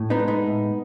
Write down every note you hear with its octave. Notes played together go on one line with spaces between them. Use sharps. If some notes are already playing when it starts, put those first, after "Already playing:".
Already playing: A2
B3 D#4
G#3
B3 D#4
A2